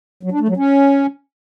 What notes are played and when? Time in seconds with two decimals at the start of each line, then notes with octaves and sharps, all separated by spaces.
0.23 F#3
0.32 D4
0.40 A3
0.48 F#3
0.57 C#4